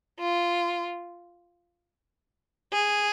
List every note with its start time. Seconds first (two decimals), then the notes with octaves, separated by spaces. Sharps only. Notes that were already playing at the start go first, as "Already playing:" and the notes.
0.20 F4
2.72 G#4